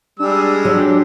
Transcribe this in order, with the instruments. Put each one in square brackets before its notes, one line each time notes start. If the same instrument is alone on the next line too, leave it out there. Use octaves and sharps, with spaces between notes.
[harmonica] G3 G#3 E6 [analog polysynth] D4 G#4
[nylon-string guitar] F#3 [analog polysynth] D4 G4